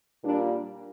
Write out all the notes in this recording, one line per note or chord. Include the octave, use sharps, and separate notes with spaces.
A#2 G3 A#3 D4